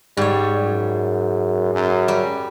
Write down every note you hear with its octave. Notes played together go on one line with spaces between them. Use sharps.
G#2 G3 C#5
F#2
F#2
G3